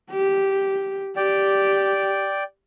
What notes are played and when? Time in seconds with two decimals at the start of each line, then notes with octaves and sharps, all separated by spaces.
0.11 G4
1.16 G4 D5 G5